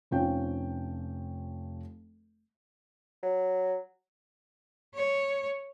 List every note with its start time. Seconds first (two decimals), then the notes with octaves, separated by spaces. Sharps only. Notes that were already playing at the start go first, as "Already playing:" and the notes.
0.11 F1 F3 C#4 G5
3.22 F#3
4.94 C#5